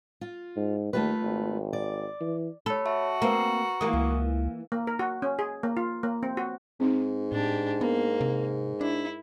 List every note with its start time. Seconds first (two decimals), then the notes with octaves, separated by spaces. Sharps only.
0.21 F4
0.57 G#2
0.93 D#2 A3 F4 B4
1.22 G#1
1.73 D5
2.20 E3
2.66 A4 C#5 B5
2.86 F#4 E5 A5
3.22 A#3 C4 B4 A#5
3.81 E3 A#3 D#6
3.93 C#2 F5
4.72 A#3
4.87 A#4
4.99 F#4
5.22 C#4
5.39 G#4
5.63 A#3
5.77 F4
6.03 A#3
6.23 C4
6.37 F#4
6.80 G#2 C4 D#4
7.32 A2 D4 G4
7.81 A#3 B3
8.21 C3
8.81 D4 E4